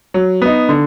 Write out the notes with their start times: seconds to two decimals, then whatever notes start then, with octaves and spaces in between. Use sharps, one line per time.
0.14 F#3
0.42 B3 D#4
0.69 D3